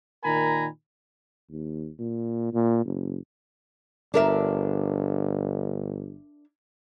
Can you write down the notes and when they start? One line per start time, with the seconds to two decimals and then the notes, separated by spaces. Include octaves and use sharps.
0.25 A#2 D#3 A#4 G#5 A#5 B5
1.50 D#2
2.00 A#2
2.54 A#2
2.86 F#1
4.14 G1 D4 A#4 E5